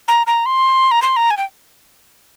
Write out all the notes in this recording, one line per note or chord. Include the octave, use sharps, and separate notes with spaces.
A#5
A#5
C6
A#5
C6
A#5
G#5
G5